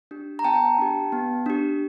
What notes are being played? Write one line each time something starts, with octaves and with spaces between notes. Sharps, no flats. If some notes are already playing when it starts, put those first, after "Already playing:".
D4 G4
A#5
B3 G5 A5
D4 G4
B3
D4 G4